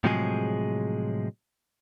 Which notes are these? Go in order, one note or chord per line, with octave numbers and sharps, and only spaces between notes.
A2 C3 F3 F#3 G#3 G#4